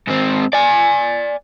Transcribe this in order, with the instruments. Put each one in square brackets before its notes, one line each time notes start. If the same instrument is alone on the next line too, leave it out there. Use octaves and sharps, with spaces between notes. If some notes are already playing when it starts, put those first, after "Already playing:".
[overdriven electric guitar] G#2 C4
D5 G#5